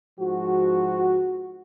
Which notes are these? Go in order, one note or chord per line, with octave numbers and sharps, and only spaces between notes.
G#2 F3 F#4